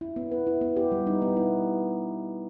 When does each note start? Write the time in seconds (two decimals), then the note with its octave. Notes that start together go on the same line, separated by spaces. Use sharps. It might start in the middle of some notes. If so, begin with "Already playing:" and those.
0.01 E4
0.16 B3
0.31 B4
0.47 E4
0.61 B3
0.76 G4
0.92 G3
1.07 D#4
1.22 B3
1.37 E4